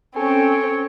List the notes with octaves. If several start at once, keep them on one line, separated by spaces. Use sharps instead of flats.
C4 C#4 A4 C#5 G#5